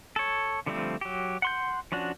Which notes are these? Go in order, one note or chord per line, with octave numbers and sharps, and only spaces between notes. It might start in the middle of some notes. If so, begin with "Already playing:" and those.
A4 C#5
D3 F3 G3 A3 C4
F#3 G4
F#5 C6 G6
F3 C#4 D4 F#4